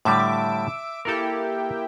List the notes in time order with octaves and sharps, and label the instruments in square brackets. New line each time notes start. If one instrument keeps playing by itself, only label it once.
[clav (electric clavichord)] A2 D3 G3 [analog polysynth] E5 D6
[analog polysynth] A#3 E4 G4 [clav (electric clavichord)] A4 A#4